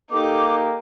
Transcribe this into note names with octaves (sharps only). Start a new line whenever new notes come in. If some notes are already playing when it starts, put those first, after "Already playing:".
A#3 D#4 G4 A4 D6